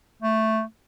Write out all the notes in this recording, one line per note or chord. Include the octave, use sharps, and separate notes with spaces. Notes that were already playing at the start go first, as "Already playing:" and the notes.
A3